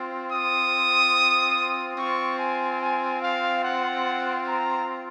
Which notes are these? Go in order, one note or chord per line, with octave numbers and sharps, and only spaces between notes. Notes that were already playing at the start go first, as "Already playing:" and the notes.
Already playing: C4 F4
D#6
C4 F4 C#6
G#5
G#5
F5
F#5
A#5